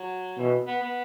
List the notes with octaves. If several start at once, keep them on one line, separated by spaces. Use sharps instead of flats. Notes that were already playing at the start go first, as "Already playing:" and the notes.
Already playing: F#3
B2 E3
B3
B3